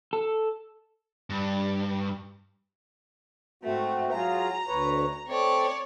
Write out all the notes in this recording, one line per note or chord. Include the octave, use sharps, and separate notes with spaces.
A4
G2
G#2 A3 C4 F#4
F#3 F4 G#4 A#5
D2 B4 C#5
A3 C4 C#5 D5